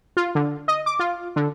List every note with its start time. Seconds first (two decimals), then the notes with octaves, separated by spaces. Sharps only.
0.17 F4
0.35 D3
0.68 D#5
0.86 D6
0.99 F4
1.36 D3